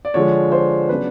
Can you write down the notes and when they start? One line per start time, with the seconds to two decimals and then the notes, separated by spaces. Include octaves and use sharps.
0.05 D5
0.14 D3 F3 G#3 C#5
0.52 C5
0.89 C#3 F#3 B3 D4 B4